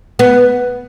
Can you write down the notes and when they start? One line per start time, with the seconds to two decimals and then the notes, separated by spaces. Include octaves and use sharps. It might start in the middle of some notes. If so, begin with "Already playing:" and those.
0.19 B3